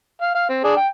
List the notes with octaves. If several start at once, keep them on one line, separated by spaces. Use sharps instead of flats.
F5
F5
C4
D4 G#4
G5